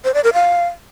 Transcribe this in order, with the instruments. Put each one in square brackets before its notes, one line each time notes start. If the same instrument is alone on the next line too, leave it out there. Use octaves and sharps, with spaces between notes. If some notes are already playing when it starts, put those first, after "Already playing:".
[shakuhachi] C5
D5
A#4
F5